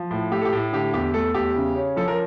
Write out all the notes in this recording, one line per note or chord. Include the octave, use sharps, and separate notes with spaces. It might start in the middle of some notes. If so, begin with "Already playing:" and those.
Already playing: F3
A2
A3 G4
A4
G4
A2
D3 G4
E2 G4
A3 A4
E2 G4
C#3
C#4
F3 A4
A#4